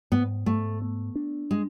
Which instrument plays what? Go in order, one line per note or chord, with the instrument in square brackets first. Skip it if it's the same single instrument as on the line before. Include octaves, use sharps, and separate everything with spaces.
[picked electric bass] G#2 [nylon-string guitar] B3
[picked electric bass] G#2 [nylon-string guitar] A3
[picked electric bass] B3
D4
[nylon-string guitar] G#3